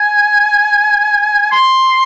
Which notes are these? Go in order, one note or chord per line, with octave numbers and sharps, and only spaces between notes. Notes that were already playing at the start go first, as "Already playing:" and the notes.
Already playing: G#5
C6